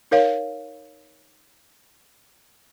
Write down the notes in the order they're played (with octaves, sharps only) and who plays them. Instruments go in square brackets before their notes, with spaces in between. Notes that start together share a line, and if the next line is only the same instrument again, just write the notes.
[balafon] D#4 A#4 C#5 F5